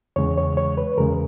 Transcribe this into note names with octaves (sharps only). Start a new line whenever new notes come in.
E2 C#3 G#3 C#5
C#5
C#5
B4
E2 C#3 G#3 A#4